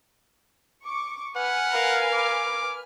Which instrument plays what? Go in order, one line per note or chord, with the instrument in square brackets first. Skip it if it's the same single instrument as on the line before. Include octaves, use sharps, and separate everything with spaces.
[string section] C#6 D6
[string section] B4 G#5 F6 [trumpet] F#5
[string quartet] A#4 F5
[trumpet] D6